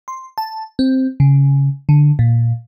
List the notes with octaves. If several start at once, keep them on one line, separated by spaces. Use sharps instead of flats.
C6
A5
C4
C#3
D3
A#2